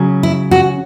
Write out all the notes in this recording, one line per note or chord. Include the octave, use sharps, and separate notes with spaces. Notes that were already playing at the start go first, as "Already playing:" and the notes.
Already playing: C#3 F#3 C#4
E4
F#4